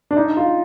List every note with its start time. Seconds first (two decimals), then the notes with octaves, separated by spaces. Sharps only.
0.11 D4
0.16 D#4
0.37 F4